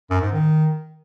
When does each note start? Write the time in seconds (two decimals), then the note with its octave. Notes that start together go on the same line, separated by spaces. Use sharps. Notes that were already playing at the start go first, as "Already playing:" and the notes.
0.10 F#2
0.21 G#2
0.32 D#3